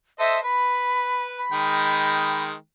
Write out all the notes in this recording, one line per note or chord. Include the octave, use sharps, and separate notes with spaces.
A4 C5 D#5 E5
B4 B5
B5
D#3 G#3 G5